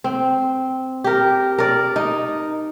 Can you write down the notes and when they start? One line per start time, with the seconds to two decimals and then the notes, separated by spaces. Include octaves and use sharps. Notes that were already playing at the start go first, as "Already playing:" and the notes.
0.04 C4
1.04 G4 A#4
1.58 A#4 D5
1.96 D#4